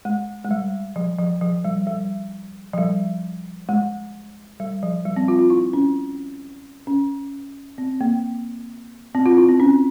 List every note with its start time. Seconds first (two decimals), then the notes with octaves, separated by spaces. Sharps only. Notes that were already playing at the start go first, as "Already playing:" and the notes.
0.05 G#3
0.45 G#3
0.51 G3
0.96 F3
1.19 F3
1.41 F3
1.65 G3
1.87 G3
2.73 F3
2.78 G3
3.69 G#3
4.60 G3
4.83 F3
5.05 G3
5.16 C4
5.28 F4
5.39 F4
5.50 E4
5.73 C#4
6.87 C#4
7.78 C4
8.01 A#3
9.15 C4
9.26 F4
9.37 E4
9.48 C4
9.60 C#4